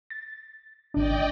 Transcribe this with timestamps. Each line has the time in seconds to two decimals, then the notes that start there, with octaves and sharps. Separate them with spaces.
0.10 A6
0.94 G#1 D4 D5 D#5 G5